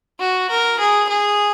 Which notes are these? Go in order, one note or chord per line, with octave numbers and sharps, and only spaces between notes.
F#4
A#4
G#4
G#4